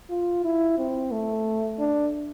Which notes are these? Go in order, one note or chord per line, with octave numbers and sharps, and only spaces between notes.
F4
E4
C4
A3
D4